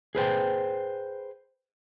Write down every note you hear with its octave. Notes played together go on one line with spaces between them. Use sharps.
G#4 B4 C5 G5